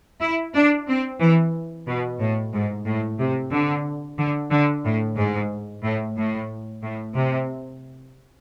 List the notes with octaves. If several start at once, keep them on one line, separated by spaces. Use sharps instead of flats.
E4
D4
C4
E3
B2
A2
G#2
A2
C3
D3
D3
D3
A2
G#2
A2
A2
A2
C3